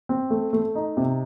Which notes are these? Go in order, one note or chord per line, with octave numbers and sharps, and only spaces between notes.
C4
A3
A3
D#4
C3